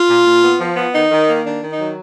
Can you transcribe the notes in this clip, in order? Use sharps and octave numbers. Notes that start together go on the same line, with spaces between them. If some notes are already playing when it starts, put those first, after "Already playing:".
Already playing: F4
A#2
A#2
B3
F3
B3
D#3 D#4
D#3
A#3
D#3 D4
D#3
D#4
F#3